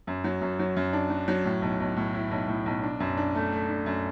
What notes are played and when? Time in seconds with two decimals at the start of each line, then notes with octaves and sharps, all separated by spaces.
0.07 F#2
0.24 F#3
0.41 F#2
0.59 F#3
0.76 F#2
0.93 D4
1.10 F#3
1.28 F#3
1.45 A2
1.62 B1
1.80 B1
1.96 A2
2.14 E4
2.31 B1
2.48 A2
2.66 B1
2.83 D4
3.00 F#2
3.17 D4
3.35 A3
3.52 A3
3.69 D4
3.86 F#2